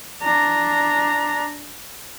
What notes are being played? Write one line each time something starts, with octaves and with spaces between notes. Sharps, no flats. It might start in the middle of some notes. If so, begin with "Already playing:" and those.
D4 A#5